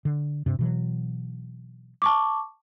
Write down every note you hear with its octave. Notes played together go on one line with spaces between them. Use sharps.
D3
G2 C3
B2 E3 F#3
A5 C#6 D6